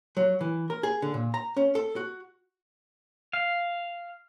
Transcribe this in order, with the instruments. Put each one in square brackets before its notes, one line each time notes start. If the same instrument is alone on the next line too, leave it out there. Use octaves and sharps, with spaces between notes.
[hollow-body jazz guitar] F#3
E3
A#4
G#4
D3
A#2
A#5
C#4
A4
F#4
[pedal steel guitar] F5